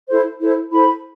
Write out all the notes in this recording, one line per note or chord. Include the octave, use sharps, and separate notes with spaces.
E4 A4 C5
E4 A4 C5
E4 A4 C5 B5